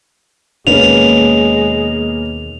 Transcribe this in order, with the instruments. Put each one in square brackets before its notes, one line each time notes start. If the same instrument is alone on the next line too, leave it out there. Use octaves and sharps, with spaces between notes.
[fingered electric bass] D#2 B2 [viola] G#3 [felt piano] A#3 C#4 B4 [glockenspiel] F7